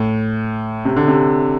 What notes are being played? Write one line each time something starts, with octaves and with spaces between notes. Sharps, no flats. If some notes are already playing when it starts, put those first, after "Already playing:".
Already playing: A2
C3
D3
C3